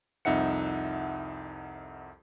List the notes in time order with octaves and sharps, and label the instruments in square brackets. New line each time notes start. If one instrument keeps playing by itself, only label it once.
[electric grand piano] C2 F2 D#4 E5 F#5 C#7